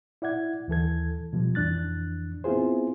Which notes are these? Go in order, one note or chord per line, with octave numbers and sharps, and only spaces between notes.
E4 D5 F#5 G#6
D#2 E3 A4 G#6
B2 F3 G3
F2 E3 D4 F#6 A6
B3 C4 E4 F4 G#4 C5